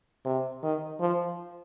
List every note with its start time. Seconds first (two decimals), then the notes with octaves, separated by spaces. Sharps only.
0.26 C3
0.63 D#3
1.01 F3